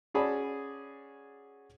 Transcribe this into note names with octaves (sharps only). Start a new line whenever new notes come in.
C#4 F#4 G#4 D5 A5 B5